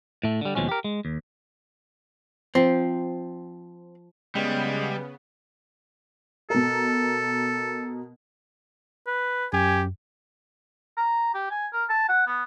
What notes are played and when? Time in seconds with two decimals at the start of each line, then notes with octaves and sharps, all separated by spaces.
0.24 A2 A3
0.41 D3 G3
0.55 D#2 B2 F3 G#3 C#4
0.69 G4 A#4
0.84 G#3
1.05 D#2
2.55 F3 C4
4.35 C#3 G3 G#3 B3
6.50 B2 A4 A#4
9.07 B4
9.53 F#2 G4 G#5
10.97 A#5
11.35 G4
11.51 G#5
11.73 A#4
11.90 A5
12.09 F#5
12.26 B3